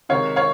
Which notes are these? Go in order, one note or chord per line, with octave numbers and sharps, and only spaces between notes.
C3 D#3 G#3 C#5 F5
C#5 F5